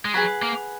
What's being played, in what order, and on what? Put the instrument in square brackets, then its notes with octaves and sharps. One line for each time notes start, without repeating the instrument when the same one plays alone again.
[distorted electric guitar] G#3
[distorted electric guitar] F#3 [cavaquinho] G#4 B4 F#5 B5
[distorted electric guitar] A#3